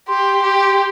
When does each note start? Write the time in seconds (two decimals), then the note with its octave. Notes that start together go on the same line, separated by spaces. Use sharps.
0.08 G4 C6
0.43 G4